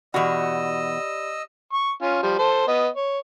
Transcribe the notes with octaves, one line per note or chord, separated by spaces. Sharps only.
E2 B2 F#4 G4 D5 D#5 B5 E6
C#6
C#4 F4
F3 G3
A4 C5
B3 D#5
C#5